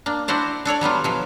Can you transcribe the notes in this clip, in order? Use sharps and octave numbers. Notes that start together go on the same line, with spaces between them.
A#3 D4
D4 E4 F#4 C5 D5
D4 A4 C#5 D5
F#3 G3 B3 F4
B2 F3 F#3